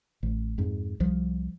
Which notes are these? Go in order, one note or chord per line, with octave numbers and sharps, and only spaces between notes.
A1
F2 G#2
C2 F3